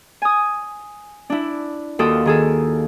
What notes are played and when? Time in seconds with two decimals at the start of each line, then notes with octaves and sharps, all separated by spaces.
0.22 G#5 D#6
1.30 D4 E4
1.99 D#2 F4 F#4 A4 G5 D#6
2.25 D#3 G#4 A4